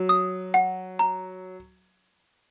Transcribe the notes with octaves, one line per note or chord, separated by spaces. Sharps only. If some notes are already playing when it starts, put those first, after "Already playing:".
Already playing: F#3
D#6
F#5
A#5